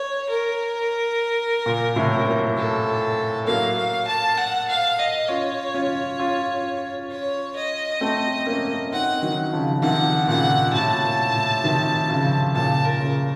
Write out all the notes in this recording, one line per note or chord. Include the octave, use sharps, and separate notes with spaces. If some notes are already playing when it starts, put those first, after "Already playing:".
Already playing: C#5
A#4
A#2
A2 C3
F#3 A#3
A4
F#3 A#3 F5
F5
A5
F#5
F5
D#5
C#4 F4 C#5
C#4 F4
C#4 F4
C#5
D#5
A3 C4
A#3 C#4
C4 D#4 F#5
D#3 F#3
C#3 F3
C3 D#3 F#5
A#2 C#3 F#5
A2 C3 A5
A#2
A2
C3 D#3
C#3 F3
A#2 C#3 A5
A#4
A#2 C#3